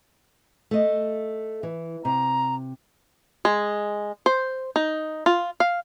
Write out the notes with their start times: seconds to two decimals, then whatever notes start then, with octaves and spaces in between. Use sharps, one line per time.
0.71 A3 D#5
1.63 E3
2.05 C3 A#5
3.45 G#3
4.26 C5
4.76 D#4
5.26 F4
5.60 F5